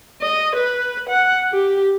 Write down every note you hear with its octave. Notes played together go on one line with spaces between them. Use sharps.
D#5
B4
F#5
G4